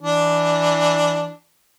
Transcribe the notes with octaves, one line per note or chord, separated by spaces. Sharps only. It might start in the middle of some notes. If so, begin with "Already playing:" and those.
E3 D4